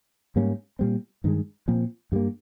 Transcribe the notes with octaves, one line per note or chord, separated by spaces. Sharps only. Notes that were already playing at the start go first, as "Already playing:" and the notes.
G#2 G3 A#3 C#4
A#2 G3 C4
G2 D#3 G#3
A#2 F3 C4
G2 G3 A#3